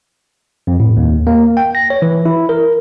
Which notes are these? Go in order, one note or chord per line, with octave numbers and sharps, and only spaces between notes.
F2
A2
D#2
A#3
G5
A#6
C#5
E3
E4
A#4